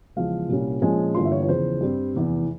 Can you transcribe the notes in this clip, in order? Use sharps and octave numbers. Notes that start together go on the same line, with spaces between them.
E2 C#3 F3 G#3 F5
C2 A#2 G3 C#4
A#1 A#2 F3 G#3 C#4 G#5
G1 G2 E3 A#3 F4 C6
E5
C#5
C#5
E2 C#3 F3 C5
G2 G3 C4
F1 E2 E3